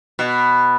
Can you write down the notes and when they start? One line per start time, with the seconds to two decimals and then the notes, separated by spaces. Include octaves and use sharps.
0.19 B2